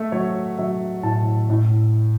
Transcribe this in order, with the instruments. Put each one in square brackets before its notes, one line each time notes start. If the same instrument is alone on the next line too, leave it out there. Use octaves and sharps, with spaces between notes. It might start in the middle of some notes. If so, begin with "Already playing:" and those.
Already playing: [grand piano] A3 E5
F#3 C#5
F#3 E5
A2 A5
A2